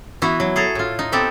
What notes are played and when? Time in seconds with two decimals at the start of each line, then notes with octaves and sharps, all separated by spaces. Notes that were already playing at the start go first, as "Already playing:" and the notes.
0.22 E3 B3 E4 F#4
0.40 F#3
0.56 G#4 A4 A#5
0.75 A2 F4
0.99 D#4
1.12 B3 C4 G4 A4